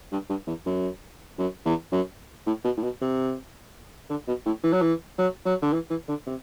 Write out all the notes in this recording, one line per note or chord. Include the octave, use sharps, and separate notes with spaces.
G2
G2
E2
F#2
F#2
E2
F#2
A2
B2
A2
B2
C3
D3
B2
A2
E3
F#3
E3
F#3
F#3
D3
E3
E3
D3
C3